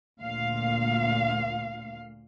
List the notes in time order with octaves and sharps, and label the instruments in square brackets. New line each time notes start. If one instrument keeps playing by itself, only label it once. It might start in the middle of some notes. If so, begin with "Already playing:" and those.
[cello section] D2 A#2 F5